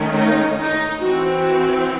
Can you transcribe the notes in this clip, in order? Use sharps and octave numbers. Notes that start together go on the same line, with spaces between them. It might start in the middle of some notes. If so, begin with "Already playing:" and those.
Already playing: D#3 A3 C#4
D#4
D#4
E3 C4 F#4
F#4